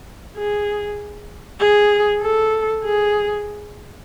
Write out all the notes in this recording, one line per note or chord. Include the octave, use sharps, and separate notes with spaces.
G#4
G#4
A4
G#4